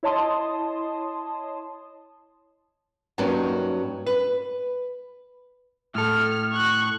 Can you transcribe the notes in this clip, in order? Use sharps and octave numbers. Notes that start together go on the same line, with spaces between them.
E4 C#5 D#5 A5 C6 D#6
G2 F#3 A#3 C#4 D#4
B4
A2 A4 F6
C#6 F#6